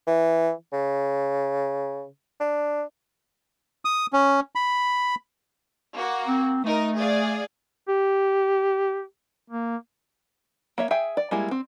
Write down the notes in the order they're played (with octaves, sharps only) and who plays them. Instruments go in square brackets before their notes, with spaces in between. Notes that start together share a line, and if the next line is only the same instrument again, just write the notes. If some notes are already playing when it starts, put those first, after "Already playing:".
[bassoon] E3
C#3
D4
[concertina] D#6
C#4
B5
[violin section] A#3 F#4
[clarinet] C4
[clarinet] A3 [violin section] D#4 A#4
[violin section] G#4 D5 F5
[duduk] G4
A#3
[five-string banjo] A#3 C#5 E5
G#4 E5 G5 G#5
D5
G3 G#3 A#3 E4 G#4
C4